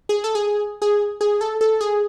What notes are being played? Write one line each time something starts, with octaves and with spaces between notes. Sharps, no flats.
G#4
A4
G#4
G#4
G#4
A4
A4
G#4